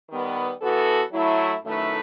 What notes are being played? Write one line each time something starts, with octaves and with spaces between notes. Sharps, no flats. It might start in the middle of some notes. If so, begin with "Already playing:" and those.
D#3 G3 B3
E3 B3 F#4 A4
F#3 A3 E4
F#2 D#3 A3 E4 B4